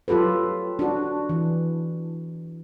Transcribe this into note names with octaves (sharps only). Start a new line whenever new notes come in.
F#3 F4 G4 A4 B4
D4 F#4
E3